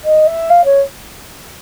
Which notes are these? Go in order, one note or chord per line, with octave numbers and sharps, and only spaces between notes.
D#5
E5
F5
C#5